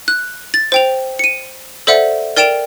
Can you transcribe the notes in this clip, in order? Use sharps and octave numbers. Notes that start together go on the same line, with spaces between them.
F#6
A6
C5 G5 F7
C#7 D#7
A4 C5 D5 E5 F#5
A#4 D5 G5 D7 E7 F7